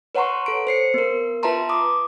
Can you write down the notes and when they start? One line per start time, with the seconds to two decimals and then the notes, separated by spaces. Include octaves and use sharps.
0.15 B4 C#5 F#5 A#5 C6 C#6
0.46 A4 D7
0.67 C5 C7 C#7
0.94 B3 A#4
1.43 F4 B4 E5 A5 A#5 C6
1.69 D6 D#6